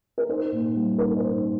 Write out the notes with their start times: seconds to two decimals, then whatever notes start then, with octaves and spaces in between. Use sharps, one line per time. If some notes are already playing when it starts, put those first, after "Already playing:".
0.18 A#4
0.29 D#4 C5
0.52 A#2
0.76 G3
0.98 D#4 A#4
1.17 C5
1.23 D#4